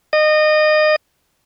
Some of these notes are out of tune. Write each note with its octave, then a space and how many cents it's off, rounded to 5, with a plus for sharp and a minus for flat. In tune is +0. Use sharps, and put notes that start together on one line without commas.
D#5 -25